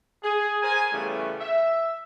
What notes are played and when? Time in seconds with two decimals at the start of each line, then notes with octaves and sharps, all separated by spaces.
0.22 G#4
0.62 G#4 A#4 C5 G#5
0.92 C#3 E3 G3 A3 B3 C#4
1.40 E5